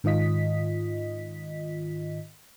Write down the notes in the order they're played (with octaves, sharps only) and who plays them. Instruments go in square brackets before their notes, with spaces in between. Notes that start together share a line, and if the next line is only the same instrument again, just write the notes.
[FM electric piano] G#2 D#3 F4 D#5 B6